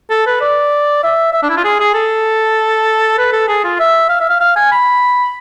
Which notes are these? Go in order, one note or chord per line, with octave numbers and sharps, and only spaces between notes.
A4
B4
D5
E5
E5
D4
E4
F4
G#4
G#4
A4
B4
A4
G#4
F4
E5
F5
E5
F5
F5
G#5
B5